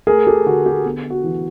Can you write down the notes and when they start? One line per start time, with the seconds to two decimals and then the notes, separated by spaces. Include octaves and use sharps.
0.07 A3 G#4 A#4
0.27 G4 A4
0.46 D3 F#4
0.66 G4
0.85 B3
1.10 F#4
1.24 E3